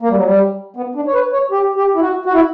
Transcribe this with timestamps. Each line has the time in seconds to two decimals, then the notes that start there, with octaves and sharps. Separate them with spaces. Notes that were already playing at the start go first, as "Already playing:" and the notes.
0.02 A#3
0.09 G3
0.16 F#3
0.23 G3
0.76 B3
0.95 D4
1.07 C#5
1.14 B4
1.33 C#5
1.51 G4
1.76 G4
1.96 E4
2.01 F#4
2.26 F#4
2.33 E4